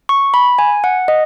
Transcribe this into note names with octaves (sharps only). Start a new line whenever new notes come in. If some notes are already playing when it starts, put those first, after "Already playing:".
C#6
B5
G#5
F#5
D#5